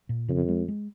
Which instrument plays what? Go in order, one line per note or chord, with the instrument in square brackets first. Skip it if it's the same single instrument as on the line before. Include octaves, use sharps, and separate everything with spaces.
[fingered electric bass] A#2
[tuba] F2 [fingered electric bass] C#3
[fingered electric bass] G#3
G#3